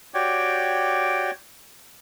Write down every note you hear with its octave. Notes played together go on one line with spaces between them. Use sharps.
F#4 G4 C#5 D5 G5